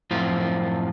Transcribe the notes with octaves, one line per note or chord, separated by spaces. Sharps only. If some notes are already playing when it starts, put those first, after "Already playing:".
F#2 A2 F3 C4 F4